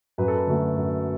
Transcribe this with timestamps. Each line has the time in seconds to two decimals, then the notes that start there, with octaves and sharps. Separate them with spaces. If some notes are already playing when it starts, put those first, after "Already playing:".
0.18 F#2 B4
0.28 A4
0.38 B4
0.47 D3 F#3 A3
0.76 F#2